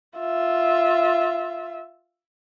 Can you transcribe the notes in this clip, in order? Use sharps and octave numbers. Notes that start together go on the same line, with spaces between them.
F4 E5